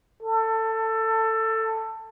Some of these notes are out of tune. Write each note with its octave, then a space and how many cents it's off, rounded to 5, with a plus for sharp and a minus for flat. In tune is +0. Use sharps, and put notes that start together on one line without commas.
A4 +20